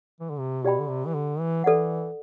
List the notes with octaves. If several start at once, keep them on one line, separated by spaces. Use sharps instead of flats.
E3
D3
C3
B2 G4 D5 G5 B5
D3
C3
E3
D3
E3
E3 A4 D5 F#5